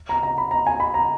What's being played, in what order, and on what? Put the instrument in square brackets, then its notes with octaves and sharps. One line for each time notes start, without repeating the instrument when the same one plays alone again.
[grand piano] A#5
A#5
B5
A#5
G#5
B5
A#5